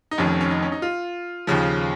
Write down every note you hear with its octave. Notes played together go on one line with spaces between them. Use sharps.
D#4
F1 F2 D#3 C#4
C#4
D#4
C#4
D#4
F4
D#2 C#3 F3